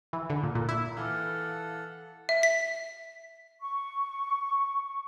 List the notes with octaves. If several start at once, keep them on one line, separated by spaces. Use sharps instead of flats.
E3
D3
A#2
A#2
E4
E3 A4 F5 F#5 D6
E5
B6
C#6